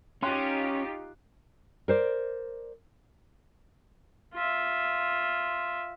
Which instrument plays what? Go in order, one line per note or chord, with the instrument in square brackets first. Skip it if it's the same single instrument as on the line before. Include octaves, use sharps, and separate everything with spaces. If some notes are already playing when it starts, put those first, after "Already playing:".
[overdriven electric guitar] C#4 [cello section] D#4 F4 G4 [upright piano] G5 C6 F#6
[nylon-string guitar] A#4 C5 D5
[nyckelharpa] F4 E5